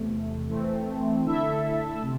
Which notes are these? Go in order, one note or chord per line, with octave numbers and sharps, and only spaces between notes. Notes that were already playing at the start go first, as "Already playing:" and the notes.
Already playing: E2 C3 E3 A3
E3 A3 C4
D3 A3 E4 A4 E5
C3